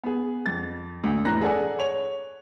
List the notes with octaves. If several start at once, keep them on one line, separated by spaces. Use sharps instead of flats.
B3 G#4
F2 A6
D2
F1 A2 E3 A#5 F#6 A#6
G#4 A4 D5 F#5 G#5
C#5 F7